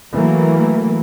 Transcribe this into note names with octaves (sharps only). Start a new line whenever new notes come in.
E3 F#3 A3 A#3